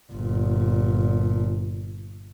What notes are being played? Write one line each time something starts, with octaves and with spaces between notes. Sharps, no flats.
G1 A#2